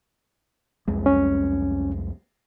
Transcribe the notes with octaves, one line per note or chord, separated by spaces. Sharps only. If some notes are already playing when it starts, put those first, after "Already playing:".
C2 F2 G#3
C#4